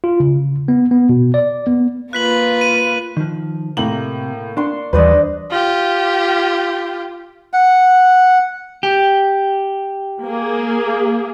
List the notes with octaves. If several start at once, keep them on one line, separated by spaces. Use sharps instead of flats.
F4
C#3
B3
B3
B2
D5
B3
A#3 F4 B4 F#6 B6 F#7
D#7
D#3 F3
A2 C3 A#3 F#7
D4 C6 C#6
D#2 E3 G3 B4 C5 D5 D#5
F4 G4
F#5
G4
A#3 G#4